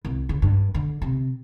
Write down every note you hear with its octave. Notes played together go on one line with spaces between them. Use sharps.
C2
C#3
G2
D3
C3